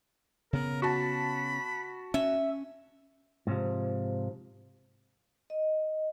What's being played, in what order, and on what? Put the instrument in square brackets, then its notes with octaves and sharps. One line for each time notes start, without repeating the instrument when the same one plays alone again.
[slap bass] C#3 B3 [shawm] A#4
[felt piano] F#4 A5 [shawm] B5
[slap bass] C#4 [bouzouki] E5
[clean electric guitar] G#2 C3 F3
[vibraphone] D#5